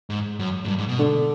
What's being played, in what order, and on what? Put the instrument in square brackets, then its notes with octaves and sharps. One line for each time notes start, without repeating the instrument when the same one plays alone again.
[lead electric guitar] G#2
F#2
G#2
G2
G#2
B2
[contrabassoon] D3